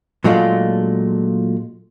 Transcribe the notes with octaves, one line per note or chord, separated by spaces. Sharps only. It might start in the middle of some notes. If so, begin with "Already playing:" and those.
A#2 F#3 G#3 A3 D4 F4